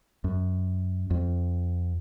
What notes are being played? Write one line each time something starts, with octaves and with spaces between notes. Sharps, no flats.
F#2
F2